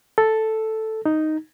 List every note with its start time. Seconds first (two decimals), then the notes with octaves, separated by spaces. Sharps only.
0.18 A4
1.06 D#4